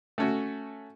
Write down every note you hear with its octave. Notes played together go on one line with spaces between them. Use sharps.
A3 C#4 F#4